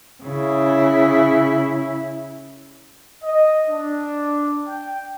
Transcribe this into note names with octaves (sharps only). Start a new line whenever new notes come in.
C#3 E4
D#5
D4
G5